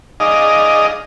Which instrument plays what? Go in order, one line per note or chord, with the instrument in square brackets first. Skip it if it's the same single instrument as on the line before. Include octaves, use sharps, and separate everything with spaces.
[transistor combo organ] D#4 G#4 D5 D#5 F5